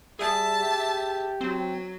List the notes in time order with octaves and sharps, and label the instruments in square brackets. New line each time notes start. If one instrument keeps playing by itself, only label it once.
[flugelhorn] G3 [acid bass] G#4 [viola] E5 A5
[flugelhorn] G4
[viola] F#3 [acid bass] C4